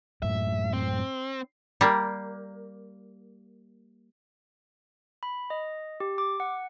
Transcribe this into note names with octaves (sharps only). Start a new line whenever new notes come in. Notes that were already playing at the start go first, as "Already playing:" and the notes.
F#2 A2 E5
C4
G3 A#3
B5
D#5
G4
D6
F#5